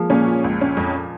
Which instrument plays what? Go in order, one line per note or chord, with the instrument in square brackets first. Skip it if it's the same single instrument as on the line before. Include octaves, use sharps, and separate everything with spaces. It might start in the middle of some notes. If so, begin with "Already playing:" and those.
Already playing: [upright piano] F3 G#3 A#3
[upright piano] A#2 [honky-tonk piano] C#4
[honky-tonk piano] F3
C#2
C#4
F2